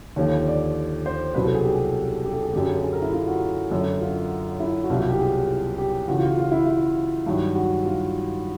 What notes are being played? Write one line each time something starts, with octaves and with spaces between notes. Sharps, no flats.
D#2 D3 F3 C#5
D5
C5
C2 B2 F#3 B4
A4
G#4
G4
G#4
G4
A4
G#4
F#2 D3 F#3 G4
G#4
A4
G#4
A#4
E4
F4
F#4
F#2 D3 F#3
F4
E4
F#4
C2 B2 F#3 F4
F4
G4
G#4
G4
C#2 C#3 E3 F#4
F4
F4
E4
E4
G2 D#3 F#3
F#4
F4